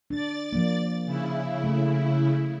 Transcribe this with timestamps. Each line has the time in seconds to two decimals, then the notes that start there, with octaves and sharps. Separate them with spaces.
0.10 D4 D5 A6
0.53 F3 A#3
1.05 C#3 E4
1.64 A3